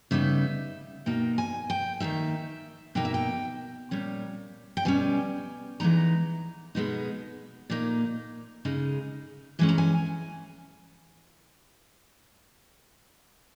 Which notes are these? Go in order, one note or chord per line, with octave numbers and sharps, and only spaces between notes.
C#3 G3 B3 D#4 E5
B2 A#3 D#4 G5
G#5
G5
D#3 A#3 D#4 E5
B2 A#3 D#4 G5
E5
G5
A#2 G3 C#4
G5
B2 G3 C#4 G#5
E3 G#3 B3 D#4 A#5
B2 G#3 B3 D#4
A#2 A#3 D#4
C#3 G#3 D#4
E3 G#3 C#4 G#5
A#5
G#5